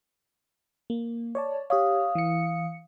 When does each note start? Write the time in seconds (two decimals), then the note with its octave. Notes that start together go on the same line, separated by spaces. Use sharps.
0.90 A#3
1.35 C#5 D5 A5
1.70 G4 C#5 F5 D#6
2.15 E3 C#7